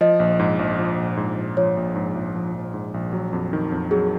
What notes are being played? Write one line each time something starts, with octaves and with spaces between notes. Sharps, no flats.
F3 D#5
A#1
G#2
A#1
F3
A#1
G#2
A#1
F3 C#5
A#1
G#2
A#1
F3
A#1
G#2
A#1
F#3
F2
D#3
F2
F#3 G#4